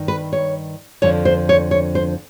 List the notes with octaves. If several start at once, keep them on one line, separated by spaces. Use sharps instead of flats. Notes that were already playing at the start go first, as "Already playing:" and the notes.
Already playing: G2 D#3
B4
C#5
F2 D3 F3 C#5
C5
C#5
C#5
C5